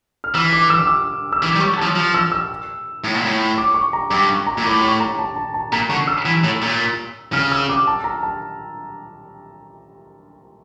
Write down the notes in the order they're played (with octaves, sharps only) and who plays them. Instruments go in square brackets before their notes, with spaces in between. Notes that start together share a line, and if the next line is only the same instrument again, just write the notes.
[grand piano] F6
[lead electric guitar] E3 [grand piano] E6
[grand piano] D6
E6
D6
E6
E6
[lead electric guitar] E3 [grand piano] D6
[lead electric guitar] G3
[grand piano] C#6
[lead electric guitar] F3 [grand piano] A5
[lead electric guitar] F3
[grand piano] E6
E6
[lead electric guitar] A2
A#2
A2
[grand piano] D6
C#6
A#5
[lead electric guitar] G2 [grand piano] D6
[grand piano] C#6
A#5
[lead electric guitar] A#2
[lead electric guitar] A2 [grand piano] D6
[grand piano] C#6
A#5
A5
A5
A5
[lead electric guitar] A#2 [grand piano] A#5
[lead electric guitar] D3 [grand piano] C#6
[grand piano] E6
[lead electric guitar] E3
A2
A#2
[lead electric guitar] C#3 [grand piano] F6
[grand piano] E6
D6
A5
A#5
A5